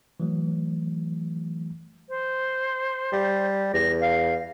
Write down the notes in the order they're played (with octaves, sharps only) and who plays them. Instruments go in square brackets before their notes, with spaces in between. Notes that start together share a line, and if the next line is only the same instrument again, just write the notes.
[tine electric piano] E3 F#3 A3
[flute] C5
[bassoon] G3
[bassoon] E2 [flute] A#6
[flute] F5